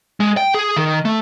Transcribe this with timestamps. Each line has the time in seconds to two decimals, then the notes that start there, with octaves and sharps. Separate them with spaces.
0.20 G#3
0.37 G5
0.54 G#4
0.76 D#3
1.05 A3